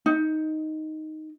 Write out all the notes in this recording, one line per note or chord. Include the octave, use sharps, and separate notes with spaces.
D#4